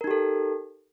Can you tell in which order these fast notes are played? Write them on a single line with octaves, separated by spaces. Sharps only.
A#4 D#4 G4 A4